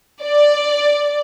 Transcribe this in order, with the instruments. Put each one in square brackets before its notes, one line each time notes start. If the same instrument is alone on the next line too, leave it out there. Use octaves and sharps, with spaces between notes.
[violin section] D5